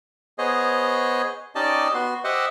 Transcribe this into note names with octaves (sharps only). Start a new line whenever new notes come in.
B3 G#4 C5 C#5 D#5
C#4 D#4 G4 D5 D#5 A5
B3 F#4 C6
G4 C5 D#5 E5 F#5